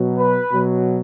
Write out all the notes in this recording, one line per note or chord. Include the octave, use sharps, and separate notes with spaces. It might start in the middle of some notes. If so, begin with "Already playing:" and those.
Already playing: B2 F#3
B4
B2 F#3